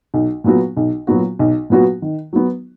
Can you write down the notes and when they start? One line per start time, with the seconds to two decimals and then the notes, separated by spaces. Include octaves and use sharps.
0.14 B1
0.44 A#2 F#3 B3 F#4
0.77 B1
1.07 A#2 F#3 B3 F#4
1.39 B1
1.70 A#2 F#3 B3 F#4
2.02 D#3
2.33 F#3 B3